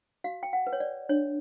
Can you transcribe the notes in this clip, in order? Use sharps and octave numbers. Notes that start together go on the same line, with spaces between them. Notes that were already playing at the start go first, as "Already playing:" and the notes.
F#4 F5
G5
F#5
B4
C#5
D5
D4 C#5